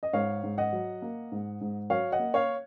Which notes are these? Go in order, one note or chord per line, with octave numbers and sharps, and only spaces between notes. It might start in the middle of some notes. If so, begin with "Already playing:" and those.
D#5
G#2 C#5 F5
G#2
D#5 F#5
F#3
A#3
G#2
G#2
F#3 C#5 F5
D#5 F#5
A#3
C#5 F5